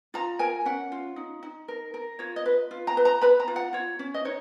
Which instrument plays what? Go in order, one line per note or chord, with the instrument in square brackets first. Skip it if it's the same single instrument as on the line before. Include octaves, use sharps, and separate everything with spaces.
[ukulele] F4 A#5
A#4 G#5
C#4 F#5
F4
D#4
D#4
A#4
A#4
F4 C#5
D#5
B4
F4
A#5
B4
A#5
B4 B5
A#5
F4
F#5
F4 C#5
C#4
D#5
D#4 C#5